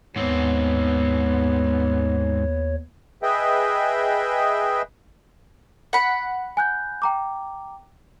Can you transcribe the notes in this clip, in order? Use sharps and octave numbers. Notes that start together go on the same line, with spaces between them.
D#2 G#2 B3 C4 C#5
G#4 B4 D#5 E5 G5
F#5 B5
G#5 F#6 G6
G5 A#5 D6